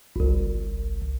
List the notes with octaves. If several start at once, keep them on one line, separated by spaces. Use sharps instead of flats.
G1 C2